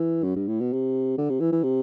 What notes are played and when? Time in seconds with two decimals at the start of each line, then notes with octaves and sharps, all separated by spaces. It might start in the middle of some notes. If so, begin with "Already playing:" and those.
Already playing: E3
0.23 F#2
0.36 G2
0.48 A2
0.61 B2
0.73 C3
1.18 D3
1.30 C3
1.40 E3
1.52 E3
1.63 C3